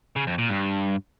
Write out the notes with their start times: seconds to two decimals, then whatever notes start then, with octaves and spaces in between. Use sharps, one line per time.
0.16 C#3
0.27 F2
0.38 A#2
0.50 G2